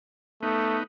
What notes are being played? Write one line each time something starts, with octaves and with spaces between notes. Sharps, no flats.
A3 B3 D#4